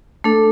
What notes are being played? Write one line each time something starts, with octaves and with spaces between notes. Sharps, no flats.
A3 D4 A4